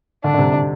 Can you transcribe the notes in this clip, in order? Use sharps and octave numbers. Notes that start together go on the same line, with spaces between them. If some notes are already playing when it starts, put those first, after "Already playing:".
D3 D4
D3
C3
D3